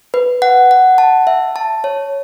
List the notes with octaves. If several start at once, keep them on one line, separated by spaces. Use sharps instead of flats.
B4
F#5
F#5
A5
E5
A5
C#5